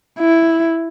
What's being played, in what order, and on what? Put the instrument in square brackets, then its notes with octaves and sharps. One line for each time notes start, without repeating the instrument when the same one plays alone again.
[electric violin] E4